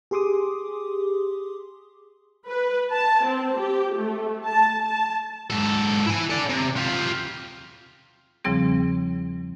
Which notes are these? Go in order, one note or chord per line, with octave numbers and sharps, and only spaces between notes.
G4 G#4 C6 D6 D#6
B4
A5
C4
G4
A3
A5
A5
G#2 A4
E4 G#5
A4 D5
C3
F4 G4
E2 C#3 F3 G3 C4 G#4